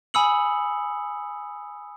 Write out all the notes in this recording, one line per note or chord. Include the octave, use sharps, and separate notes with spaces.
G#5 B5 D#6 E6 C#7 F#7